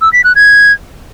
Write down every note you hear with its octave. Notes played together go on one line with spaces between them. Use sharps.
E6
B6
F#6
G#6